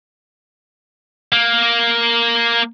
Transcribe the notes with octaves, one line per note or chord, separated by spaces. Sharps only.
A#3